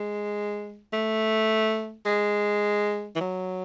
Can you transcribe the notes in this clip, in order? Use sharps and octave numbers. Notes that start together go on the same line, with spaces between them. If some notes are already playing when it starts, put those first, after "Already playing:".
Already playing: G#3
A3
G#3
E3
F#3